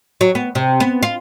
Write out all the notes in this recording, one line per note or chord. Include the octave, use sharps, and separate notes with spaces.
F#3
B3
C3
B3
F4